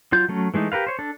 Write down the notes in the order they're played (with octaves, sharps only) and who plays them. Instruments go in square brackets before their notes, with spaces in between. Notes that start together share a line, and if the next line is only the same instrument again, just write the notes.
[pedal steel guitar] F#3 F4 G6
F#3 A3 C#4
E3 G#3 A3 D#4
G4 A#4 B4 F5
C5 C#5
D4 A4